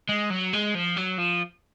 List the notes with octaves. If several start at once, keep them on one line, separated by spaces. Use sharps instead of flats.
G#3
F#3
G#3
F3
F#3
F3